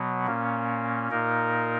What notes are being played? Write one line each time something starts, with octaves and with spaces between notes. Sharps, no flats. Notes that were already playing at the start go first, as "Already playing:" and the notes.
Already playing: B2 F#3 B3
A#2 A#3 C#4
A#2 A#3 D#4 A#4